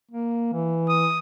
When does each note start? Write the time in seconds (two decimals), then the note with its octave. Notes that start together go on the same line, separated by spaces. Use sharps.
0.11 A#3
0.53 E3
0.89 D#6